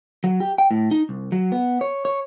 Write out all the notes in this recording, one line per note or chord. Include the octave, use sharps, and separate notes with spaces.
F#3
G4
G5
A2
D#4
C2
F#3
B3
C#5
C#5